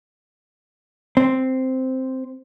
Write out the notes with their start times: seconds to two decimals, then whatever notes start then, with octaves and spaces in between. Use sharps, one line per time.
1.17 C4